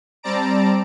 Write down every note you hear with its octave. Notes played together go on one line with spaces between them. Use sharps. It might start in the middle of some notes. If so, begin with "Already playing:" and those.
G3 C4 D5 A5 A#5 D7